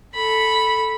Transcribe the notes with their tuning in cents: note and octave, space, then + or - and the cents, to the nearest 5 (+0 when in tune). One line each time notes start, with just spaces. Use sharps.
A4 +0 B5 -5